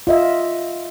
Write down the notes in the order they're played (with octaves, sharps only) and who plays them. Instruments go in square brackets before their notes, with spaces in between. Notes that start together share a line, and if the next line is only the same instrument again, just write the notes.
[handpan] F4 D#5 E5